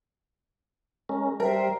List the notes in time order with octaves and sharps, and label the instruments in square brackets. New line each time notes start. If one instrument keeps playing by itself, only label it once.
[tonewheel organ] G#3 C#4 A#4
[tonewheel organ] G3 [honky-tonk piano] A#4 [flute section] C5 E5 G5